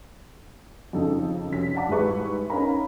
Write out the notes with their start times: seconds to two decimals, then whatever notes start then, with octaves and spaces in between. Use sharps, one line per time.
0.93 F2 C#3 D#4 A4 A5
1.50 F1 C#4 B6
1.75 D5 F5 F#5 A5 A#5 D6
1.88 G#2 G3 G#3 E4 B4 C#6
2.50 C#4 D#4 A#4 F5 A#5 B5